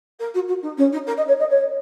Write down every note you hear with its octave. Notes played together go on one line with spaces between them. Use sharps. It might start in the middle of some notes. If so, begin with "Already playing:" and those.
A#4
F#4
F#4
D#4
C#4
D#4
A#4
D#5
C#5
D#5
C#5